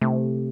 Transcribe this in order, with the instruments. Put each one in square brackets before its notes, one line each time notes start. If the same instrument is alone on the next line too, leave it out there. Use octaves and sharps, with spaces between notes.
[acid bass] C3 [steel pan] A3